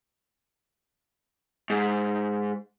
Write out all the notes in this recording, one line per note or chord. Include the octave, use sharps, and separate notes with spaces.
G#2